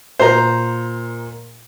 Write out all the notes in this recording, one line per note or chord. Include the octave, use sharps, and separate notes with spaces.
A#2 C5 A#5